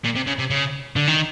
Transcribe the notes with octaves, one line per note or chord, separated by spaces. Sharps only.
A#2
C3
C#3
C3
C#3
D3
D#3